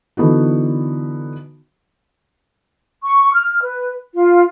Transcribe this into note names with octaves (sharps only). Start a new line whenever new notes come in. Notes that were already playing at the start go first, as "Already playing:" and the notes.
D3 E3 B3 D#4 F#4
C#6
F6
B4
F4